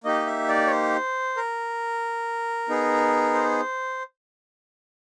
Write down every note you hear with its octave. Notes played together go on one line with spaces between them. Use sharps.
A#3 D#4 G4 D#5
E5
D5
C#5
C5
A#4
B3 D#4 G#4
C5